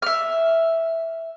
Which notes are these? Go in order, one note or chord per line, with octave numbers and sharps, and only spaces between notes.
E5 F6